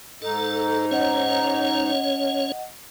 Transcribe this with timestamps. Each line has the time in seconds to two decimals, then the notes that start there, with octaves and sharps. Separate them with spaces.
0.22 G#2 D#4 A4
0.91 C#4 C#5 D#5 F#5